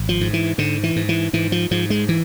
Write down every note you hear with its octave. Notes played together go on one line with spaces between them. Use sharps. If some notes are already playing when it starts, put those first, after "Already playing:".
Already playing: G#1
F3
G#2
E3
G#2 D3
E3
G#2
E3
G#2 E3
F3
G#2 F3
G#3
E3